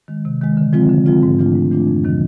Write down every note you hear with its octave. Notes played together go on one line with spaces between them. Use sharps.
D#3 G#3
C3
D#3 G#3
D3
F3 G#3 C4 F4
D3
F3 G#3 C4 F4
G#2
E3 A3 D4 F4
G#2
E3 A3 D4 F4
F2
C3 D#3 F#3